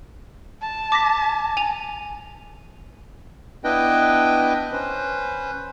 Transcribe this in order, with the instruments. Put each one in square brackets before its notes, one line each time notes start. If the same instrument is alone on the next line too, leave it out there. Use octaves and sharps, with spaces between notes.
[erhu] A5
[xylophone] D6 A#6 B6
G#5 F7
[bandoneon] B3 D4 E4 B4 D#5 G5
C#4 B4 C5